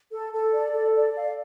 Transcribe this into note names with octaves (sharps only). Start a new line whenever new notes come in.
A4
A4
D5
A4
D5
F5